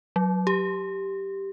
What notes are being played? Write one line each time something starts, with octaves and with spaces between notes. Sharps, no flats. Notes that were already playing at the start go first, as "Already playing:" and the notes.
F#3
G4